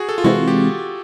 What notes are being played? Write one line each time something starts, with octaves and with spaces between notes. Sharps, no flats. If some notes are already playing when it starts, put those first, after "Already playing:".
Already playing: F#4 G#4
A4
F4
C3 E3 G#3 C4 E4 F#4
G4